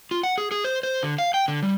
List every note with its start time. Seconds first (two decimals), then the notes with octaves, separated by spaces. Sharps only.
0.11 F4
0.23 F#5
0.38 G#4
0.51 G#4
0.64 C5
0.83 C5
1.03 D3
1.18 F5
1.34 G5
1.48 D3
1.62 G3